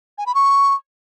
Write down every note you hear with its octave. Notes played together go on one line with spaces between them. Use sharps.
G#5
B5
C#6